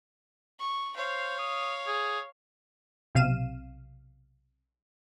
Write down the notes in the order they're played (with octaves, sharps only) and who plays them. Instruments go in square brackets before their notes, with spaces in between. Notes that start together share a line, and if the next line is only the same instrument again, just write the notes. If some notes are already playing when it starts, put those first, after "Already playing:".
[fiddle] C#6
[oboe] C5 [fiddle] C#5 F5
[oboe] D#6
G#4
[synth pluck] B1 C3 F5 D#7 E7